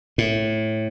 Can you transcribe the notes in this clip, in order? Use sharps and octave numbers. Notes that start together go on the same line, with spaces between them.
A2